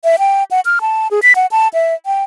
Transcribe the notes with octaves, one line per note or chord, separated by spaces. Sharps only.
E5
G5
F#5
F6
A5
G#4
B6
F#5
A5
E5
G5